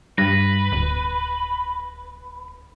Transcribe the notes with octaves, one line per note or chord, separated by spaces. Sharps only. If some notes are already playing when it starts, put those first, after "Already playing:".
G2 B4 A#6
D1